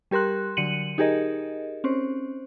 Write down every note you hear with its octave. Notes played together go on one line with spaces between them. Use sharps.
G3 G4 A#4 C6 F#6
D3 F#3 C#7 D#7 F#7
D#4 G4 G#4 A#4 D#5
C4 C#4 C5